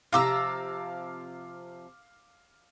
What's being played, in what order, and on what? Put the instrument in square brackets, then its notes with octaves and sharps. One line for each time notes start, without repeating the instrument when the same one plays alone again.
[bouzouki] C3 F3 A#5 [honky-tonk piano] F5 D6 E6